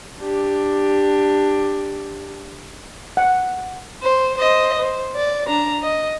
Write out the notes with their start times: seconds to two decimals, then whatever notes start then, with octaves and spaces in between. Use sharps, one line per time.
0.20 D4 G4
3.17 F#5
4.02 C5
4.38 C5 D#5
4.79 C5
5.15 D5
5.47 D4 A#5
5.82 D#5